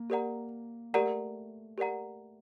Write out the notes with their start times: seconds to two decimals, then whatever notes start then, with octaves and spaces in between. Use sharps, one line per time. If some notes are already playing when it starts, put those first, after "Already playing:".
Already playing: A#3
0.10 G4 A#4 D5 F#5 A#5
0.93 A3 G4 A#4 D5 F#5 A#5
1.78 G4 A#4 D5 F#5 A#5